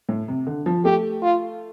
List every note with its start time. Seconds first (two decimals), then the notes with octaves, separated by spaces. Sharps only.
0.09 A2
0.28 C3
0.47 D3
0.66 F3
0.85 A3 G4
1.23 F4